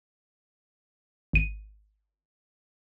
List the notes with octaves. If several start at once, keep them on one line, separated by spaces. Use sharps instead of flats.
G#1 D#7